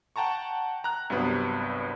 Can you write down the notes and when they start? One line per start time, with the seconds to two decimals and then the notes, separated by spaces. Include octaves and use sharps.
0.16 F#5 G5 A5 A#5 C#6
0.84 A#5 F#6
1.10 C2 G2 C3 F#3 B3